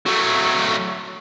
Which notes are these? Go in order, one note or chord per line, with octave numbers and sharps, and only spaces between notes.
F#3 A3